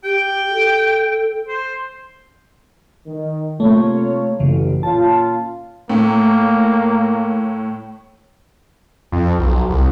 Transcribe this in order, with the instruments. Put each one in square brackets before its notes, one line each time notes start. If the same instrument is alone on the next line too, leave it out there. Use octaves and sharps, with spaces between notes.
[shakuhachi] G4 [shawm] G5
[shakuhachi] A4
[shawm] C5
[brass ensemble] D#3
[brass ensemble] C3 F4 C#5 [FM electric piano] A3 A#3
[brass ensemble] A1 [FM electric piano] F#2 C#3 E3
[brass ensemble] A#2 C#4 F4 [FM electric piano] A5
[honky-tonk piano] A2 [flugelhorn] A#3
[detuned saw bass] F2
B1
C2